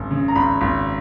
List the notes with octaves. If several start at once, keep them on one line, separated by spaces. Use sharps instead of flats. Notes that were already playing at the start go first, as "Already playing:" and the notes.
Already playing: G#1 F#2
C#3
A#5
G#1 B5
G#1